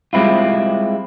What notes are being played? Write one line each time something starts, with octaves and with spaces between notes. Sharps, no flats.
G3 G#3 C4 E4 F4